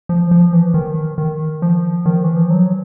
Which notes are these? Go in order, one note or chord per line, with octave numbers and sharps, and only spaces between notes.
F3
F3
E3
D#3
D#3
F3
D#3
E3
F3
F#3